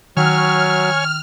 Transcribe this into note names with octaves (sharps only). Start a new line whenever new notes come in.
D#3 F#3 C#5 G5 G#5 F6